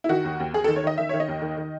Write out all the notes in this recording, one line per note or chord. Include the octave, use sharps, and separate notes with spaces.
E4
D#3 F#4
D#2
D#2
D#2 G#4
A4
D#3
C#5
D#3 D#5
D#3 E5
D#3 C#5
D#5
D#2
D#3
D#3